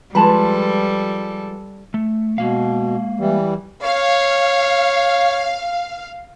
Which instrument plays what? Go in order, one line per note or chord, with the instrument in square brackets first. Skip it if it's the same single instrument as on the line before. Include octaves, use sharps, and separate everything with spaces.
[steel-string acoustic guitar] F3 G#3 B4 [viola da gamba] G3 A4 [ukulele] F4 A5 B5
[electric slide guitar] A3
[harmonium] B2 [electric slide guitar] G#3 A#3 F5
[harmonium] E3 G3
[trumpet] C#5 [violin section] F5